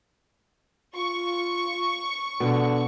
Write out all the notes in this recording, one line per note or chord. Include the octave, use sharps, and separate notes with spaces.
F4 C#6
B2 D3